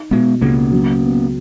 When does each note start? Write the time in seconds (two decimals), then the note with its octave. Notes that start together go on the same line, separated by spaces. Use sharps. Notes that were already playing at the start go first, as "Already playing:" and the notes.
Already playing: D#4
0.11 B2 G#3 B3
0.41 C#2 A#3 C#4
0.72 F#3
1.03 B3